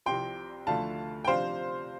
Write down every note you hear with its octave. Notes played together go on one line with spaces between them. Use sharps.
C2 C3 F3 G5 C6
D2 D3 F3 A3 F5 A5
G5
C3 F3 D4 C5 F5